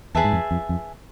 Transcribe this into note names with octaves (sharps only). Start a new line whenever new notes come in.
E2 G#4 B4 E5 A5
G#2
F2
F2
F2